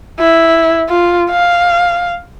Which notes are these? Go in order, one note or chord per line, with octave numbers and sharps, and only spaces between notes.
E4
F4
F5